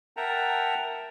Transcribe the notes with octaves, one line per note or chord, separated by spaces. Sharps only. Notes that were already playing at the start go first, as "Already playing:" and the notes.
A#4 E5 F#5 G5 A5 A#5